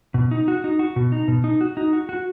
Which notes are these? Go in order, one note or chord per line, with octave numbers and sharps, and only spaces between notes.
B2
D#4
F#4
D#4
F#4
B2
D#4
B2
D#4
F#4
D#4
F#4
F#4